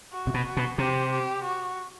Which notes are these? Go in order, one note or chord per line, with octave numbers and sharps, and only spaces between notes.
F#4
C3
B2
F#4
B2
C3 G4
G4
F#4